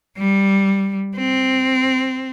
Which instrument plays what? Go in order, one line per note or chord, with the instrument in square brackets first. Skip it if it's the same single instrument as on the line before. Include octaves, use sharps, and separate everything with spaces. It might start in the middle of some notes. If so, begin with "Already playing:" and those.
[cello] G3
C4